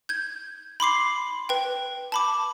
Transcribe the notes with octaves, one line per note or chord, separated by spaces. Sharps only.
G6 G#6
B5 C6 D6 C7
B4 G5
A5 B5 D6